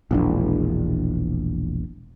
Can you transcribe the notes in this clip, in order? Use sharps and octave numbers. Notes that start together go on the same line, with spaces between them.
E1 A#1 D4